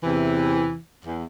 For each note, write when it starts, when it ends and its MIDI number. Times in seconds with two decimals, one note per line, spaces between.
0.03 0.76 40
0.03 0.76 48
0.03 0.76 52
1.05 1.25 40